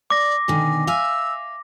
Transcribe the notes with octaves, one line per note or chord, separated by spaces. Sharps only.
D5 D6 A#6
B2 D3 D#3 G#5
E5 F5 G#5 E6